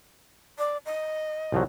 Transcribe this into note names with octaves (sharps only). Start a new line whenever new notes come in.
D5
D#5
C2 F3 F#3